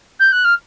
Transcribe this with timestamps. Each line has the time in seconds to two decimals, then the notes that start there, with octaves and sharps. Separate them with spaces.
0.20 G6
0.32 F#6
0.45 F6